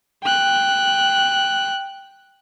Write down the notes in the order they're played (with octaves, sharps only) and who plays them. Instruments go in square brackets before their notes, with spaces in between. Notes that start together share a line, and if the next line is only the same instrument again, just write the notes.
[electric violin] G5 F#6